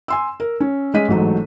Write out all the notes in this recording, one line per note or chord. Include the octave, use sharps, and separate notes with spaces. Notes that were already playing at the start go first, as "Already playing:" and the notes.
G#5 C6 E6
A#4
C#4
G#3 C#4 D#5 B6 D#7
A1 G#2 F#3 A3